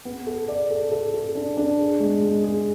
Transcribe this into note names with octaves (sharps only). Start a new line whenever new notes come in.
B3
A4
D5
A4
A4
A4
D4
D4
G#4
G#3
G#3
G#4